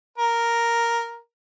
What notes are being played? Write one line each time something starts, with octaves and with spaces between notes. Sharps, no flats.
A#4